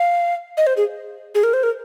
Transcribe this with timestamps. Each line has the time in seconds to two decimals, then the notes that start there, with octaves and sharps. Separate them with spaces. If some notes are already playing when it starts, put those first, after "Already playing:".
Already playing: F5
0.57 D#5
0.67 C5
0.77 G#4
1.35 G#4
1.43 A#4
1.53 C5
1.63 A#4